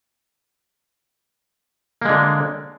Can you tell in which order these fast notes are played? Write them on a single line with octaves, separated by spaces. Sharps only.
A#3 G#3 D3